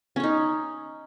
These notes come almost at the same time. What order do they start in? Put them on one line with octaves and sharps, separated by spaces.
C#4 C#5 D#4